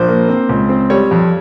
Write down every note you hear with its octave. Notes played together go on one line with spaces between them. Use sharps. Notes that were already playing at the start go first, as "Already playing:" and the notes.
Already playing: A#1 C5
A#3
C4
C#2
C4
G3 C#5
F2